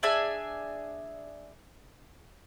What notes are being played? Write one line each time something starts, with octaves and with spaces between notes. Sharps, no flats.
D4 G#4 E5 G#5